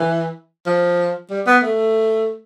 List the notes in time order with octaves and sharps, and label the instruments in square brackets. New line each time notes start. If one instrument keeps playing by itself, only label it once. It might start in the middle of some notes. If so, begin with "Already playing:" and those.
Already playing: [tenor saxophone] E3
F3
G3
B3
A3